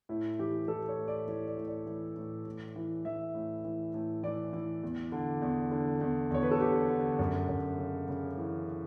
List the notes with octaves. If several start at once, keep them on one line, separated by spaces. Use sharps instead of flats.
A2 E4
E3 G4
E3 A4
C#5
A2
D5
E3 C#5
D5
A2
D5
E3
A2
A2
E3
E3 E5
A2
E3
A2
E3 D5
E3
E2
D3
E2
D3
E2
E2 C#5
B4
A4
D3 G4
D3
F#2
F#2
C#3
C#3
E3